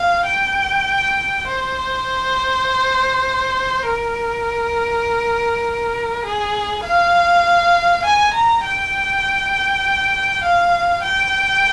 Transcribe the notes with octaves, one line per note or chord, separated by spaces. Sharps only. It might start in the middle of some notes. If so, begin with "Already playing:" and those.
Already playing: F5
G5
C5
A#4
G#4
F5
G#5
A#5
G5
F5
G5